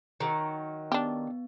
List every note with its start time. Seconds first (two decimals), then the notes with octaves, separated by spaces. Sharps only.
0.20 D#3 F#3
0.92 B3 D4 G4